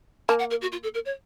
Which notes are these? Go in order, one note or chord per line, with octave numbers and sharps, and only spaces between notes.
A#3 A5
F#5
A#4
F#4
F4
A4
A#4
C#5